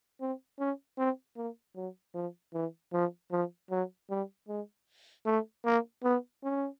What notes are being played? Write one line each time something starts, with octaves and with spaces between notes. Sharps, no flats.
C4
C#4
C4
A#3
F#3
F3
E3
F3
F3
F#3
G3
G#3
A3
A#3
B3
C#4